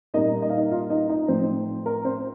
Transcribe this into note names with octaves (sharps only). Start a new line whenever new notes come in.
A#2 G3 A#3 D#4 D#5
D#5
F5
D#4 D#5
F4 F5
D#4 D#5
D#4 D#5
A2 F3 C4 C5
A#4
C4 C5